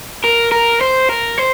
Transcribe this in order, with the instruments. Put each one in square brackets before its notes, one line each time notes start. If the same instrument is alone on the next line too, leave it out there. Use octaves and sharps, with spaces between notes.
[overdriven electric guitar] A#4
A#4
C5
A#4
C5